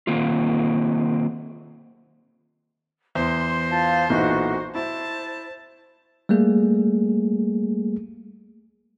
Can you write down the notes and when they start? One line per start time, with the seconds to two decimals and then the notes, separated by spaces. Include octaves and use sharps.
0.07 D#3 A#3 C4 F4
3.15 E2 C5 C6
3.70 F4 F5 A5
4.10 B1 A#2 E3 F#4 D#5 C#6
4.75 E4 C5 A5
6.29 G3 A3 A#3 G#4